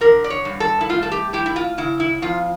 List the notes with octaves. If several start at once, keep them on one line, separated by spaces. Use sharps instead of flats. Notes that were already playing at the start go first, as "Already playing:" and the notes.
D3 A#4
D5
C#5
G2
A4
E4
A3 F4
A4
G4
E4 G4
E4
F4
C#3 E4
E4
F2 F4